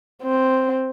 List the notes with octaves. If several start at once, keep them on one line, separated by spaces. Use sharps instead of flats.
C4